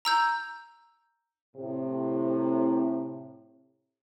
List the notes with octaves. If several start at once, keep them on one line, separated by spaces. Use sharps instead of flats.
A#5 E6 G6
A2 C3